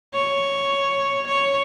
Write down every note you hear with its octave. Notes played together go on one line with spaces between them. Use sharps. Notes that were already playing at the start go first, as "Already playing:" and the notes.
C#5
C#5